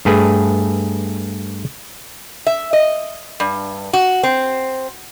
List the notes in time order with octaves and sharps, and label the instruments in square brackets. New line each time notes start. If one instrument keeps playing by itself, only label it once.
[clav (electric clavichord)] G2 A3 G#4 B4 G#5
[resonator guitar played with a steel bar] E5
D#5
G2
F#4
C4